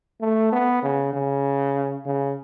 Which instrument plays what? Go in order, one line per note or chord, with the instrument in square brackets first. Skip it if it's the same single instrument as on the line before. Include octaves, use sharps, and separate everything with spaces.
[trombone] A3
B3
C#3
C#3
C#3